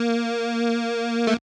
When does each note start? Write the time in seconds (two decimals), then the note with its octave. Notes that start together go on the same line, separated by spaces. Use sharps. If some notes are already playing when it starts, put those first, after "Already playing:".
Already playing: A#3
1.27 A3